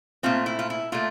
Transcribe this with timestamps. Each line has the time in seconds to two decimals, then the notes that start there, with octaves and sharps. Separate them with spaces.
0.23 A#2 A3 C4 F4
0.46 E4
0.59 F4
0.70 E4
0.92 A#2 A3 F4